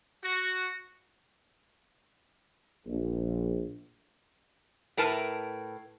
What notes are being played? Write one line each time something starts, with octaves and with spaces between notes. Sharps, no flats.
F#4
A#1
A2 A#4 B4 A5